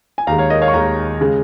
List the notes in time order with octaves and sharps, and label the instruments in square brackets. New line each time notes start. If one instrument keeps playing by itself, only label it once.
[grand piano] G#5
D#2 D#3 G#3 F5 A#5
C#5 F5
A#4 D#5
C#5 F5
C#6
D#2 D#3 G#3 F5 A#5
C#3 G#3